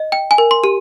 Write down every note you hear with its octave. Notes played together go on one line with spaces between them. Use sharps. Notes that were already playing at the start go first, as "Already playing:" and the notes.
Already playing: D#5
G5
G#5
A#4
C6
G4